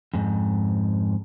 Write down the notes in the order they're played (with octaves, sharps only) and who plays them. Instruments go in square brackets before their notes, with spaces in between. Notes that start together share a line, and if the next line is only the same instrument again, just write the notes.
[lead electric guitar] F2 G#2